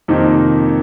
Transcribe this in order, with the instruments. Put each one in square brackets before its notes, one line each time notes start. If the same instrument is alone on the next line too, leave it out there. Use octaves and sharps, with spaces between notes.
[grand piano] F2 C3 D#3 A#3 D#4